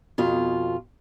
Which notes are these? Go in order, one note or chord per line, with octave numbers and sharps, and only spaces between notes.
F2 B2 F4